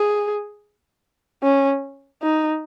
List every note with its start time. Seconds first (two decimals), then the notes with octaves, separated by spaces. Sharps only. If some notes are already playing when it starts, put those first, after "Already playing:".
Already playing: G#4
1.43 C#4
2.23 D#4